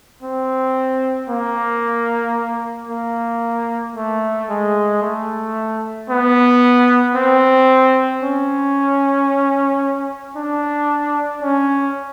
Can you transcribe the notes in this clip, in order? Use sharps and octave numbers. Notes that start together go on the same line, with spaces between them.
C4
A#3
A#3
A3
G#3
A3
B3
C4
C#4
D4
C#4